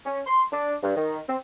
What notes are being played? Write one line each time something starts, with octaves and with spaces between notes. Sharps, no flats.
C#4
C6
D4
G2
D#3
C4